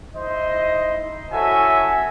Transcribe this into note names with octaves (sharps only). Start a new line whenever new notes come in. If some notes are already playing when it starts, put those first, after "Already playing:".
D#4 E4 C5 D#5
C#4 E4 F#4 A4 E5 G#5